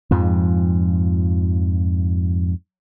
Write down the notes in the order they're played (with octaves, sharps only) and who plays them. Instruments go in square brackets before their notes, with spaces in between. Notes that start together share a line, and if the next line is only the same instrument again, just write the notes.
[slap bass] F2 G#2 F3